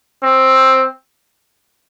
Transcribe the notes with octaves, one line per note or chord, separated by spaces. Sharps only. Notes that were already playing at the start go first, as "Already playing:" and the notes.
C4